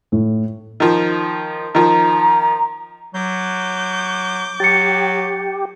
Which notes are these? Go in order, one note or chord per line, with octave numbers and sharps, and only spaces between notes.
A2
D#3 F3
D#3 F3 A#5
F#3 D6 G6
F#3 G4 A6 C#7